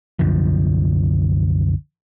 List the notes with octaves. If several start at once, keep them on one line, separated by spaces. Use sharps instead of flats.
C2 F#2 D3 F3